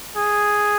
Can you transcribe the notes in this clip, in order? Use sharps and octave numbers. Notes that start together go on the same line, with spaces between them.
G#4